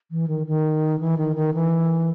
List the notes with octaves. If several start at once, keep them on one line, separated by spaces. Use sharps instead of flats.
E3
D#3
D#3
E3
D#3
D#3
E3